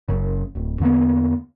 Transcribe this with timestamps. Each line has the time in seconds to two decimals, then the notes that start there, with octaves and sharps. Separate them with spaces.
0.08 F#1 F#2 C#3
0.55 D1
0.80 E2 D3 A#3 B3